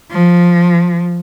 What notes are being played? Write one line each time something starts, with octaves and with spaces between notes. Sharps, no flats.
F3